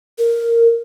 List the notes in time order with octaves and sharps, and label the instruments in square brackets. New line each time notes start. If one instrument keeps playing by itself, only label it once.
[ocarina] A#4